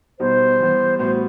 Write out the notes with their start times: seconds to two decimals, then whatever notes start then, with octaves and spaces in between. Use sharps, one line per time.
0.19 B2 G3 B3 D#4 C5
0.60 E3 G3 B3
0.99 A2 G3 B3 F#4 C5